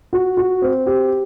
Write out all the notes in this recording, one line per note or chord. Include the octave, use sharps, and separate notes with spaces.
F#4
F#4
C4
G4